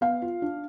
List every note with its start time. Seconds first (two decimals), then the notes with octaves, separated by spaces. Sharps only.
0.01 B3 F5
0.22 F4
0.42 D4